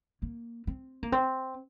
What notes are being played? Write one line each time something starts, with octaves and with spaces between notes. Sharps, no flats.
A#3
C4
A#3
C4